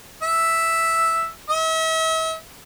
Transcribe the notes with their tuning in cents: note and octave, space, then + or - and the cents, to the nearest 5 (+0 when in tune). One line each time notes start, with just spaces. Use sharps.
E5 +0
E5 -40